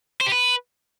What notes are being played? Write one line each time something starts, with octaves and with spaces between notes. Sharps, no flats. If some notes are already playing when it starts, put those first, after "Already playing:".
C5
G4
B4